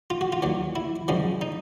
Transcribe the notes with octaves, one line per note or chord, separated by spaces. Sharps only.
F4
F#4
F4
D#2 D#3 F#3
E4
F#2 C#3 F3 G#3
D#4